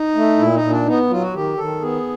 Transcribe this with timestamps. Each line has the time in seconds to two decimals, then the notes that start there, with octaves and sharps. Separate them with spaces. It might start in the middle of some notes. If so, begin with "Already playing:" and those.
Already playing: D#4
0.15 A3
0.38 A#2 E4
0.55 D#4
0.62 A#2
0.70 D4
0.86 B3 D#4
1.10 F#3 F4
1.21 F#4
1.34 D#3 G4
1.58 D#3 A4
1.81 B3 G#4